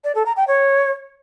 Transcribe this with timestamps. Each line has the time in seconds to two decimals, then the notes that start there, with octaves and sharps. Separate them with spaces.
0.04 D5
0.15 A4
0.26 A#5
0.37 G5
0.48 C#5